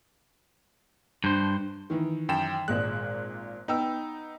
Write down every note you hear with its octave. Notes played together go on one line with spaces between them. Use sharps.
G2 D4 C5
D#3 E3
F#2 G5 E7
G#1 A#2 G#3 F#6
B3 D#4 G5 E6